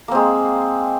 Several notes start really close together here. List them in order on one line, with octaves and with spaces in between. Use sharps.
A#3 C4 G#3